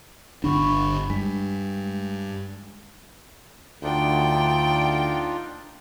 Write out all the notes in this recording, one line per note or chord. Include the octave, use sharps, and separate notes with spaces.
G1 D3 D4 B5 C#6
G2 G#3
D2 D4 D#4 F4 G5